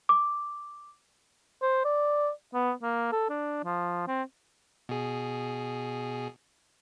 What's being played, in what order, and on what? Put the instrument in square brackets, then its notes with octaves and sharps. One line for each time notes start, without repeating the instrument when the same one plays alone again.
[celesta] D6
[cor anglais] C5
D5
B3
A#3
A4
D4
F3
C4
[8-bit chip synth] B2 G#4